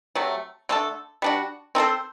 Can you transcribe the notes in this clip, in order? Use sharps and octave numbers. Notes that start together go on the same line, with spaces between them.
C3 F#3 A3
D3 A3 D4 A4
G3 D4 F#4
C4 D#4 A4 C5